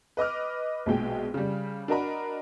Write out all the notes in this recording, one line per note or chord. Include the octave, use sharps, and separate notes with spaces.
B4 D#5 D6 F6
A#1 B2 G#3 G5
C#3 G3
D4 F#4 A#4 D#5 A#5 B5